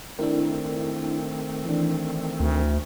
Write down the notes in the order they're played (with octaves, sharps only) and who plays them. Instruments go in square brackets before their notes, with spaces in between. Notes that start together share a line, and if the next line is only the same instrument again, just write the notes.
[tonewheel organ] D#3 A3 C4 [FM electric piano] D4 E4 A#4
[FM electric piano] E3 D4
[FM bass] D2